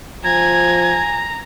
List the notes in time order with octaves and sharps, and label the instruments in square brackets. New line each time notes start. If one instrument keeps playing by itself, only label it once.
[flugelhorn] F3 [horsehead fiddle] G#5 [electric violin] A#5 [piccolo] G#6